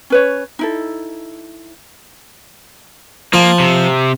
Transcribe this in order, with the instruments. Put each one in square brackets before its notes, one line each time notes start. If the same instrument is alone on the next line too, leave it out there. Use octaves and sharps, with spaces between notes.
[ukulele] C#4 B4 C#5
D#4 E4 A4
[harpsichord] F3 [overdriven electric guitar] A#3
[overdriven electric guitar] C3